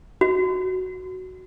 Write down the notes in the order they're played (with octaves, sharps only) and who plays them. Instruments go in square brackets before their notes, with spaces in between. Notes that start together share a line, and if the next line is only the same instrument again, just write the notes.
[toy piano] F#4